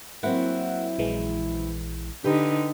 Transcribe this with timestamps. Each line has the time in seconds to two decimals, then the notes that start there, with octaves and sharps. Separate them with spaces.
0.23 F#3 A#3 C4 E4 F#5
0.98 A#1 E3 G#3
2.24 D3 D#4 G4 B4